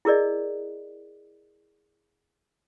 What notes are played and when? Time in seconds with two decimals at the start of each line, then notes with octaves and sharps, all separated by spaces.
0.05 E4 G#4 A#4 D5 D#5